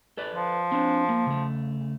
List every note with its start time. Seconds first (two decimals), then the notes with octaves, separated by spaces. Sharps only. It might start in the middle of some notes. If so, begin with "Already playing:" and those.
0.17 A4 B4 D5
0.35 F3
0.72 C4 D4
1.09 A#3
1.26 C#3 A3